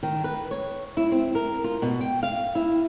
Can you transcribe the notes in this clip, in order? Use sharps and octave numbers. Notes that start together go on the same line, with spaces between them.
D#3
B4
C#5
E4
C4
A#4
F4
B2
G5
F5
E4